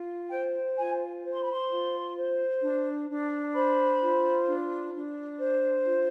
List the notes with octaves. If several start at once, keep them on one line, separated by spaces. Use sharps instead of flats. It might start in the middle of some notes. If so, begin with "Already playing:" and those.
Already playing: F4
C5 G5
F4 G#5
C5
C6
B5
C6
F4
C5
D4
D4
C5 B5
F4
D4
D4
C5
F4